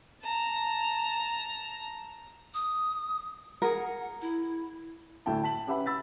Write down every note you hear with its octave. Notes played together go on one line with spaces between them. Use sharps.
A5 A#5
D#6
G#4 A#4 F#5
E4
D2 A2 E4 G5 A5
A5 B6 F#7
C#4 G4 B4 E5 F#5 B5
B5 E6 A6 B6